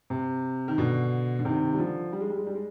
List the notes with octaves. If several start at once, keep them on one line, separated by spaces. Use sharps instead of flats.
C3
D#3
B2 D3
D3
C3 D#3
G3
D3 F3
G3
G#3
G3
G#3
G3
G#3